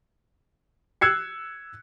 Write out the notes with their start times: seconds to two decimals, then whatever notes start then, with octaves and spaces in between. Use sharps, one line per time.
1.01 E6 F#6 G#6 C7 C#7